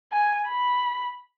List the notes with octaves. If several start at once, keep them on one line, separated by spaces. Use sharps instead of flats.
G#5
B5